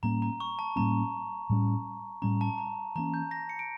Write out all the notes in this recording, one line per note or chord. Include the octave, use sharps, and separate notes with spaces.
A2 G3 A#3 C#4 A#5
A#5
C#6
A5
A2 G3 A#3 C#4 A#5
A2 G3 C#4
A2 G3 C#4 A#5
A5
A#5
E3 A#3 C#4 A#5
G6
A#6
C#7
D7